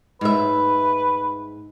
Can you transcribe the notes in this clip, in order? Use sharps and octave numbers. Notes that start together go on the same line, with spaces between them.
G#2 B4 E5